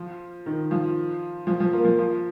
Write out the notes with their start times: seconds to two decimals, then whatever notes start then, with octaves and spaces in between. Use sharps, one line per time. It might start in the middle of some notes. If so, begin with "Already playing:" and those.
Already playing: F3
0.46 D#3
0.71 F3
1.47 F3
1.60 F3
1.73 A#3
1.85 F3
1.98 F3